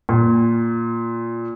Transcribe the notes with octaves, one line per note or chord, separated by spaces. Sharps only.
A#2